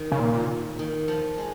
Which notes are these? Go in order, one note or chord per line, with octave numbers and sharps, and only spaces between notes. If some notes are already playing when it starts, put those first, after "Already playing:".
Already playing: D#3
C#3
A#2
D#3
F3
G#3